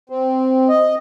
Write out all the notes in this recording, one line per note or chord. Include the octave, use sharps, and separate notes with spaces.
C4
D#5